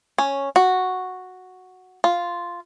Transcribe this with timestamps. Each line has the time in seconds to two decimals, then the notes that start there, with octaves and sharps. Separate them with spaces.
0.18 C#4
0.56 F#4
2.04 F4